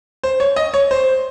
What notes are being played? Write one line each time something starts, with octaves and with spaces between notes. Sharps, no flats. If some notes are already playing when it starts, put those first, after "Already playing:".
C5
C#5
D#5
C#5
C5